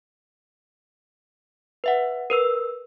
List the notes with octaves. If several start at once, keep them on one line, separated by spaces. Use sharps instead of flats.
B4 E5 F#5
A#4 B4 E6